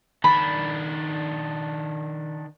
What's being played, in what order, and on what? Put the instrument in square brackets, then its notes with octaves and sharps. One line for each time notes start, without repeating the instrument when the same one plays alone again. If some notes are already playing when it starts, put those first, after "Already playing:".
[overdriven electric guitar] D#3 D4 [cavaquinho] B5